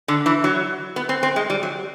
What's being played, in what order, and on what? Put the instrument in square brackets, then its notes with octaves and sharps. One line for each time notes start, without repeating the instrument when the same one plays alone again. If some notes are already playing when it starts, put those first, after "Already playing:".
[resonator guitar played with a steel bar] D3
E3
F#3
B3
C4
C4
G#3
G3
F#3